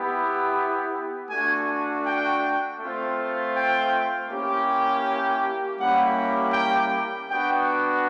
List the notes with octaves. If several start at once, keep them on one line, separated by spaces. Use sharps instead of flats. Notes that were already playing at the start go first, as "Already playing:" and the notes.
Already playing: B3 E4 G4
A3 D4 F#4 G#5
G5
A3 C4 F4
G5
A#3 C#4 E4 G4
G5
G3 A#3 C#4 E4 G4 F#5
G5
B3 D4 F#4 G5